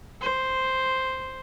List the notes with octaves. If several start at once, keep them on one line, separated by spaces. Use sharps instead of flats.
C5